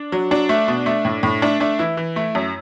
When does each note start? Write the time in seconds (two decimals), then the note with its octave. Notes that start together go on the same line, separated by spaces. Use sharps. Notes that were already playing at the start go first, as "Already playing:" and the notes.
Already playing: D4
0.12 F#3
0.31 F#3 D4
0.49 A3
0.68 B2
0.86 A3
1.05 A2
1.23 A2
1.42 A3 D4
1.60 A3 D4
1.79 E3 E4
1.97 E3
2.16 A3
2.35 F#2